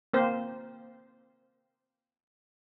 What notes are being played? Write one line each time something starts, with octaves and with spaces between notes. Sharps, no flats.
A#3 C4 C5